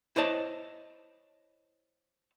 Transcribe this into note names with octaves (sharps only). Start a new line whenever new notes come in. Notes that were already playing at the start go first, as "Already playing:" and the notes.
E4 C5 C#5 D#5 A5